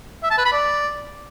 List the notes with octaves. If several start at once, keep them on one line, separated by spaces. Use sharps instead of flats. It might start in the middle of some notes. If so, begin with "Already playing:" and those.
E5
A5
B4
B5
D5